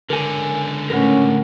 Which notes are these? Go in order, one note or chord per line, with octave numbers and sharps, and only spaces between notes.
C#2 D3 A#4 G#5
A2 C#4 A#4 B4 F#5